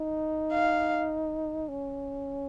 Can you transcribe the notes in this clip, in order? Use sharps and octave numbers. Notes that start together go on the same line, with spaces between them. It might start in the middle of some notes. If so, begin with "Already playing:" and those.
Already playing: D#4
F5
C#4